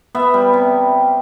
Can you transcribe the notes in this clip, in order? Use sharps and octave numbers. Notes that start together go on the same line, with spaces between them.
B3 E5
G3
C3